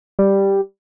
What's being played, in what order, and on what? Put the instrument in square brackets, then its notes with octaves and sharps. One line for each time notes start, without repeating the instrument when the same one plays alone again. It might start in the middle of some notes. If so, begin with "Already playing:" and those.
[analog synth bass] G3